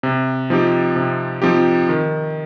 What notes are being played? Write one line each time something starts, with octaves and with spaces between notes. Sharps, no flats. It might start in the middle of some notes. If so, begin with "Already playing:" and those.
C3
F3 C4 D#4 G4
C3
F3 C4 D#4 G4
D#3